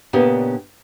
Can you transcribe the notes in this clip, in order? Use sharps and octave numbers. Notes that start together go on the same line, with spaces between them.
A#2 C#3 B3 D4 G4